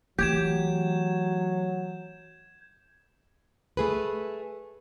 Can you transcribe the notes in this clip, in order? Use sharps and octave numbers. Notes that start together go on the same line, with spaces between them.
E3 F#3 A3 G4 G6 G#6 E7
A3 G#4 B4